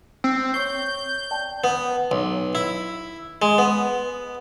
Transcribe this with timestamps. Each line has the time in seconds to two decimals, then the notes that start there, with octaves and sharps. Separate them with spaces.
0.24 C4 E6 C7
0.54 C#5 C#6 G6 C7
1.31 D5 G5 A5
1.64 B3
2.11 B1
2.55 E4
3.42 G#3
3.58 B3